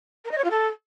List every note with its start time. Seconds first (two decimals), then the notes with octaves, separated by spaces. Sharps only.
0.25 A#4
0.31 D#5
0.38 C#5
0.44 F4
0.51 A4